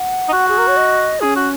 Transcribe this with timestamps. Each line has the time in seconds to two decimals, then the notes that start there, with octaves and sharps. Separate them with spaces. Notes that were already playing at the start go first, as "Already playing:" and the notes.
Already playing: F#5
0.28 D#4
0.33 F#4
0.48 G#4
0.58 A#4
0.68 C#5
0.77 D#5
1.21 C#4 G#4
1.36 F#4